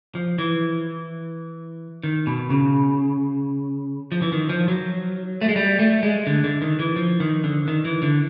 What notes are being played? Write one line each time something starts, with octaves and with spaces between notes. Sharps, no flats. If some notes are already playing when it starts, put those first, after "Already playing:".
F3
E3
D#3
B2
C#3
F3
E3
D#3
F3
F#3
A3
G#3
G3
A3
G#3
D3
D3
D#3
E3
F3
D#3
D3
D#3
E3
D3